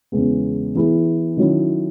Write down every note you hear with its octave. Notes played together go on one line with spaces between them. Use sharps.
E2 C#3 G#3 B3
E3 B3 E4 G#4
D#3 F#3 C#4 E4